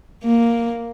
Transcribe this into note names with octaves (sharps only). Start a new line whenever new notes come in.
A#3